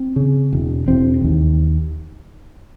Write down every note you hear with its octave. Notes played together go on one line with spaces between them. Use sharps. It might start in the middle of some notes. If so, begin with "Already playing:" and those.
Already playing: C4
C#3
E1
E1 C4
D#2